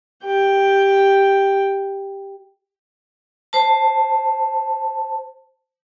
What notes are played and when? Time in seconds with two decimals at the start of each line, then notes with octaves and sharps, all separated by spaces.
0.23 G4 G5
3.53 C5 A5